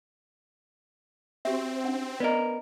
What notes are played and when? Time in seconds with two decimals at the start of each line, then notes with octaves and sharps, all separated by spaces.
1.45 C4 F#4 G4 E5
1.84 C#4 D4 F#5
2.20 B3 A#4 B4 D5 D#5